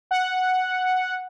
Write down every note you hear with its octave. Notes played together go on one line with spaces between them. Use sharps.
F#5